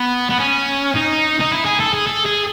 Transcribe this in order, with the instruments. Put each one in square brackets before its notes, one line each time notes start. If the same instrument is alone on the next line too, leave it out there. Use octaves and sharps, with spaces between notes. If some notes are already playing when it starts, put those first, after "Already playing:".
Already playing: [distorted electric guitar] B3
B3
C#4
D#4
D#4
E4
G#4
A4
G#4
A4
G#4